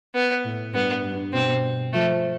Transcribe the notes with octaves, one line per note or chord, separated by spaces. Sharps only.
B3
A2
G2 B3
G2
B2 C4
F3 A3